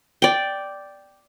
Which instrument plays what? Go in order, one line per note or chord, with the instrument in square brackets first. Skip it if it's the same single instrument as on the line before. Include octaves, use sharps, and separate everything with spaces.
[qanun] D5 G5